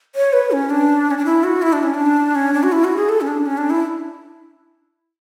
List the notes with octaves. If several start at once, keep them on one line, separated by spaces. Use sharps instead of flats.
C#5
B4
C#4
D4
C#4
D4
E4
F#4
E4
D4
C#4
D4
C#4
D4
F#4
E4
F#4
G#4
A4
C#4
D4
C#4
D4
E4